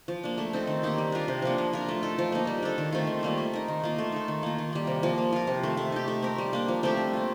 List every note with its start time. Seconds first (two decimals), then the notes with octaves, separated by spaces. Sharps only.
0.08 F3
0.23 A#3 D4
0.38 A3
0.53 C4 D#4 A4
0.67 D#3
0.83 A#3 D#4 G4
0.98 G3
1.12 D4 F4 A#4
1.28 C3
1.42 F3 A#3 D4
1.58 A#3
1.73 D4 F4 A#4
1.88 A3
2.03 D#4 A4
2.18 F3
2.32 A#3 D#4
2.47 G3
2.63 D4 A4
2.78 D#3
2.92 A3 C4 F4
3.07 D#3
3.23 G3 A#3 F4
3.38 A3
3.53 D#4 A#4
3.68 D#3
3.83 A#3 F4
3.98 A3
4.12 D#4 A4
4.28 D#3
4.43 A#3 F4
4.58 D#3
4.73 G3 A#3
4.87 C3
5.03 F3 A#3
5.18 A#3
5.33 F4 A#4
5.47 C3
5.63 D#3 A3
5.77 A3
5.92 D#4 G4
6.08 A3
6.22 C4 G4 A#4
6.38 G3
6.53 A#3 D4
6.68 F3
6.83 A3 C4 G4
6.97 G3
7.13 A#3 F4